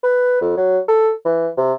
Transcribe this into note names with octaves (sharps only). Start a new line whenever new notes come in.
B4
F2
F#3
A4
E3
C3